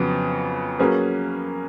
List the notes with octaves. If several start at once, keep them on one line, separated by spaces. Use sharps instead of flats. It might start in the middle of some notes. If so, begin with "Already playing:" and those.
Already playing: F2 C#3 F#3 B3
F#3 A#3 C#4 G#4 B4